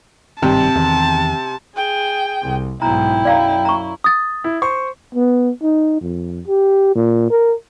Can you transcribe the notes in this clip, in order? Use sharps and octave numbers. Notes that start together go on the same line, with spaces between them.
G#1 G2 C3 D#3 A5
E2 D#3
G#4 G5
C2
B1 G#2 E4 G5 A#5
F#2 D5 F5 A#5
A#5 C#6
D#6 A6
E4
C5 C6 C#6
B3
D#4
F2
G4
A#2
A#4